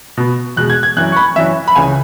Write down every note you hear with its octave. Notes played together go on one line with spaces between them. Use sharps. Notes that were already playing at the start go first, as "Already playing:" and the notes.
B2 B3
E2 B2 G#3 F#6
G#6
G#6
F#2 E3 C#4 F#6
C#6
B5
F#2 E3 C#4 E5
B5
C#2 C#3 E3 C#4 G#5